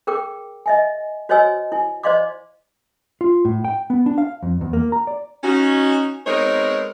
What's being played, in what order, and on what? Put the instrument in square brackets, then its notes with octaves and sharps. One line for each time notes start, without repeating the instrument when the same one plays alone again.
[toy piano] G#4 A#4 G5 D6
D#5 E5 G#5
F#4 C5 C#5 D#5 G#5 E6
E4 G#5
C5 D5 D#5 F5 C6 D6
[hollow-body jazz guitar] F4
A2
G5
B3
D4
F5
F2
E2
A#3
A#5
D5
[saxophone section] C#4 D#4 F#4
G#3 B3 C4 D#4 A#4 C#5